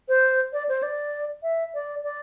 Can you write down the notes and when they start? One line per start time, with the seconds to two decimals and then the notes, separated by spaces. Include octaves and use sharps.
0.09 C5
0.53 D5
0.69 C5
0.83 D5
1.43 E5
1.74 D5
2.04 D5